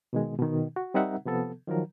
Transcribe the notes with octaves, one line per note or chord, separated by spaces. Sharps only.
B2 D#3 G#3
B2 D#3
F#4
G3 C4 D#4 A#4 E5 F#5
C3 F3 B3 A4
D#3 F3 F#3 A#4